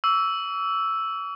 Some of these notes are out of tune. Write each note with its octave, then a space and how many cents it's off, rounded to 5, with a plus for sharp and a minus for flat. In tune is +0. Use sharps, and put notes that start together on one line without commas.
C#6 +45 E6 +0